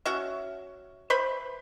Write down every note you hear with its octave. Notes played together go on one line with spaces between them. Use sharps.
C#4 F#4 E5
B4 C5 E5 B5